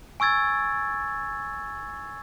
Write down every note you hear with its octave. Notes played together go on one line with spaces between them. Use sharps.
G#5 C#6 E6 G#6 A6